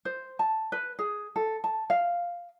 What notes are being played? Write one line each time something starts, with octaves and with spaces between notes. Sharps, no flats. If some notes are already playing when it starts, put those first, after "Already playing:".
C5
A5
B4
G#4
A4
A5
F5